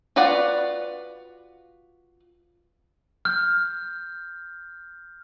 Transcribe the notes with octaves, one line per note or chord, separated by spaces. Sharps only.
F4 F#4 B4 D5 F#5
F6 G6